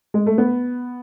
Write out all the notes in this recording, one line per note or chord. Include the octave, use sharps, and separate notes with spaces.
G#3
A3
B3